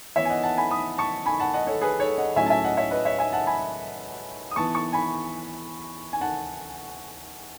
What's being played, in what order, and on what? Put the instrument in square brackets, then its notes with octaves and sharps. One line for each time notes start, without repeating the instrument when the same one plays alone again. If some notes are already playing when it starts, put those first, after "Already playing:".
[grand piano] E3 B3 C#5 E5
G#5
D#5 F#5
F#5 A5
G#5 B5
B5 D#6
A5 C#6
G#5 B5
F#5 A5
D#5 F#5
A4 C#5
G#4 B4
A4 C#5
D#5 F#5
A2 F#3 A3 C#4 E5 G#5
A5
E5 G#5
D#5 F#5
C#5 E5
B4 D#5
C#5 E5
E5 G#5
F#5 A5
G#5 B5
D#6
E3 B3 A5 C#6
A5 C#6
G#5 B5
G#5
F#5 A5